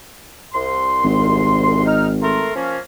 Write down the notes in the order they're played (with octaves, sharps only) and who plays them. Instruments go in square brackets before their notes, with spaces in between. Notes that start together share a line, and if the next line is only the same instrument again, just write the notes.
[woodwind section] C2 C6
[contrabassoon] G#1
[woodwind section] D#4 F6
A3 A#4 C6
F3 A#3 C#4